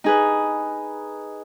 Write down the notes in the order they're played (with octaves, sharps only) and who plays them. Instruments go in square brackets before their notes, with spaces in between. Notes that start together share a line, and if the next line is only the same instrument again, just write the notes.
[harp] D#4 G#4 B4